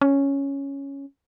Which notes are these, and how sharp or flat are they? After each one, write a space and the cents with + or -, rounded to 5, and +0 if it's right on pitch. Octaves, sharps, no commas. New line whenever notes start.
C#4 +0